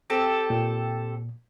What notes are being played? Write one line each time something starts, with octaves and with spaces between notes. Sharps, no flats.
C4 G4 A4
A#2